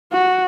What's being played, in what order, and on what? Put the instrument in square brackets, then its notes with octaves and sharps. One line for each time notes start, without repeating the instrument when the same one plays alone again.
[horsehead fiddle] F#4